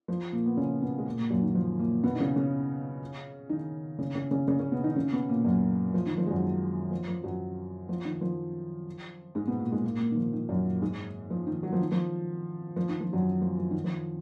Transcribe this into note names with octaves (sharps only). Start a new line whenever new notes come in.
F3
A#2 A#3
B3
C#3 C#4
B2 B3
G#3
A#2 A#3
A#2 A#3
F#2 F#3
D#3
F3
A#2 A#3
B2 B3
D#4
C#3 C#4
C#3 C#4
D#3 D#4
C#3 C#4
C#3 C#4
C#3 C#4
C#3 C#4
C#3 C#4
B2 B3
D#3 D#4
C#3 C#4
B2 B3
A#2 A#3
F#2 F#3
F3
D#3
F3
G#3
F#2 F#3
D#3
F3
F3
F#2 F#3
F3
D#3
F3
G#2 G#3
B2 B3
A#2 A#3
G#2 G#3
A#2 A#3
A#2 A#3
D#3
F3
D#3
F#2 F#3
A#2 A#3
G#2 G#3
F3
D#3
F#3
F3
D#3
F3
F3
D#3
F3
F#2 F#3
F3
F3
D#3
F3